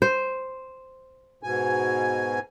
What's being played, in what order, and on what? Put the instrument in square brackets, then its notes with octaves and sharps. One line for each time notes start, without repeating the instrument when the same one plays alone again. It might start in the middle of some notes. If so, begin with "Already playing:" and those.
[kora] C5
[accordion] G#2 B2 G#5